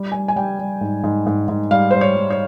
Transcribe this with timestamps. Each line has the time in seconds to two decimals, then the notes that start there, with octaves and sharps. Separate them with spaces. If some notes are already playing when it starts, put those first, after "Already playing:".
Already playing: G3
0.12 G3 G#5
0.28 G#5
0.36 G3 G5
0.59 G3
0.81 G#2
1.04 G#2
1.26 G#2
1.48 G#2
1.71 G3 F5
1.91 G3 C5
2.01 C#5
2.16 G3
2.30 C#5